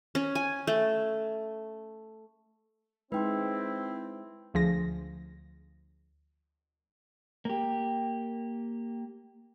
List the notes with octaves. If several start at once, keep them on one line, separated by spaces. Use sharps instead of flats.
C#4
G#5
A3
G#3 C4 D#4 E4 B4 G5 C6
D2 F3 G#4 A#6
A#3 G4